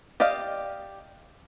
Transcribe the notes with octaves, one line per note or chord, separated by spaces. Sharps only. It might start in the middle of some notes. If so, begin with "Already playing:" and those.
G4 D5 D#5 F5